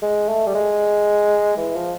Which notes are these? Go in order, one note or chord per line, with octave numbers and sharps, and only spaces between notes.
G#3
A3
G3
G#3
E3
F3